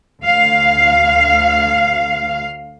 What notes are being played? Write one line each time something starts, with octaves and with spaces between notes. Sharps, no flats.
D2 F5